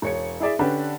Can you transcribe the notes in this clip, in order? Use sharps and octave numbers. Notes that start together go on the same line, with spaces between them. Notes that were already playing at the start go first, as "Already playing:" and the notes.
E1 C#5 C#7
E4 G#4 D5 E5
D3 C#4 D4 G4 B4